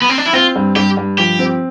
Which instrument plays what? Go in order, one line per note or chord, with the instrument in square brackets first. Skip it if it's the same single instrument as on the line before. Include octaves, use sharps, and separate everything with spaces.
[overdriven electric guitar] B3
C4
D4
E4
[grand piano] C4 [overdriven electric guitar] F4
[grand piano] G2
[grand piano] G2 [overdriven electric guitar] G4
[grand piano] G2
[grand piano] F3 [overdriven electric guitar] G4
[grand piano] C4